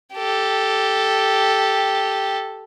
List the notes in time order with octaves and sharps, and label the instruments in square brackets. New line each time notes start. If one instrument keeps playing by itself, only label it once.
[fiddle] G4 A4